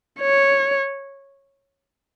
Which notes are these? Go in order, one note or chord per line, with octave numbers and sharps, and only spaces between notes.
C#5